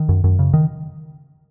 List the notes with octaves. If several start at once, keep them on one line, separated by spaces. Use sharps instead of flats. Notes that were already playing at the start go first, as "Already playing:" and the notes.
Already playing: D#3
F#2
F#2
C#3
D#3